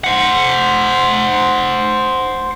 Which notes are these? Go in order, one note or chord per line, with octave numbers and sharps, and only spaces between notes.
C5 F#5